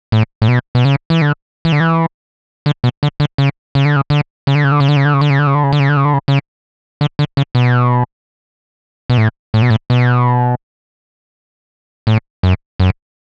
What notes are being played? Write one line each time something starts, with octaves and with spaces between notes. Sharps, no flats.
A2
A2
B2
B2
C#3
E3
D3
E3
D3
E3
D3
B2
D3
D3
C#3
C#3
D3
C#3
D3
C#3
D3
C#3
D3
C#3
D3
C#3
D3
C#3
D3
C#3
D3
C#3
D3
C#3
D3
C#3
D3
C#3
D3
C#3
C#3
D3
D3
C#3
B2
B2
A2
A2
B2
A2
B2
A2
F#2
F#2